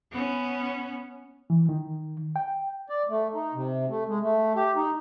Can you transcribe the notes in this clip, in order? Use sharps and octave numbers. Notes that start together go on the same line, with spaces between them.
B3 C#4
E3
D#3
G5
D5
A3
D#4
C3
A3
G#3
A3
G4
D#4